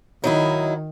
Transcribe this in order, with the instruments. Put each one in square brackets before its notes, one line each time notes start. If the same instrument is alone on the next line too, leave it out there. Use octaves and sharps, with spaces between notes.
[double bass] D#3 [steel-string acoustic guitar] F#3 D#4 E4